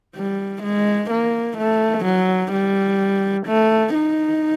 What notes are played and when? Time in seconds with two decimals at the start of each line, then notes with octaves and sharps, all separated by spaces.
0.16 G3
0.63 G#3
1.11 A#3
1.58 A3
2.05 F#3
2.52 G3
3.46 A3
3.95 D#4